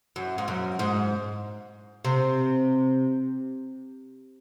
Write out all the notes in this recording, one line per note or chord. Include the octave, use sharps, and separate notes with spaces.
F#2
G#2
F#2
G#2
C3